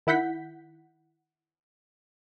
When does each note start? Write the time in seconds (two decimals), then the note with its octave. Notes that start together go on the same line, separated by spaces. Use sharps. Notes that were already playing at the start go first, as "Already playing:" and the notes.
0.07 D#3 E4 F#5 G6 B6